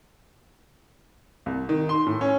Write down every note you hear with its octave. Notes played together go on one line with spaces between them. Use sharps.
C2
D#3
C6
A2
C#4